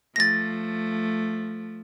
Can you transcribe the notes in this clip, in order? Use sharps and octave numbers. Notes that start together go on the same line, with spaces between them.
F3 A3 A6 A#6